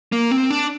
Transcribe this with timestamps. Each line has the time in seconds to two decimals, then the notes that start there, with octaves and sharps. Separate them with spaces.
0.12 A#3
0.31 C4
0.50 D4